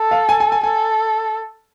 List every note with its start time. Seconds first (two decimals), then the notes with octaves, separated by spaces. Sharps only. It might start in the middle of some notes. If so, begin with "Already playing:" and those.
Already playing: A4
0.11 F5
0.29 G#5
0.40 G#5
0.52 G#5
0.63 A4 G#5